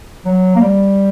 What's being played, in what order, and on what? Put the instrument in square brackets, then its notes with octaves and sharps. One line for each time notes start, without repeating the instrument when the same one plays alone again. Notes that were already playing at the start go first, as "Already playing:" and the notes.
[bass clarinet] F#3
A#3
G3